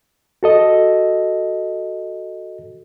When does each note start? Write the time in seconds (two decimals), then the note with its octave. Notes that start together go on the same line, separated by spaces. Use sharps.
0.43 F#4 A4 D#5